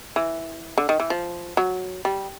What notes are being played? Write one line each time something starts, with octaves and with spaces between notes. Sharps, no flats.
E3
D3
D#3
E3
F3
F#3
G3